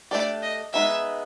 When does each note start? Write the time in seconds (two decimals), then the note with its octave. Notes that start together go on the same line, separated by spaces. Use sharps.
0.11 A3 D4 G4 D5
0.42 D#5
0.73 G#3 B3 D#4 G#4 E5